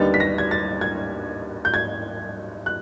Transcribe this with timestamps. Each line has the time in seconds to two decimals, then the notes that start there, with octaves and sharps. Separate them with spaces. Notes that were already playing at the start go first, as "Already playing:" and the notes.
Already playing: D#2 D3 G3 B3 D#4 A6
0.14 B6
0.20 A#6
0.38 G#6
0.51 A6
0.81 G#6
1.65 G6
1.74 G#6
2.66 F#6